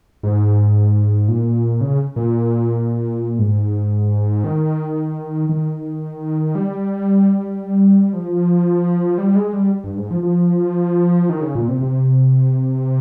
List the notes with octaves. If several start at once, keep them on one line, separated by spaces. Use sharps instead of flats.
G#2
A#2
C#3
A#2
G#2
D#3
D#3
G3
F3
G3
G#3
G3
G2
G#2
F3
F3
D#3
C#3
A#2
C3
C3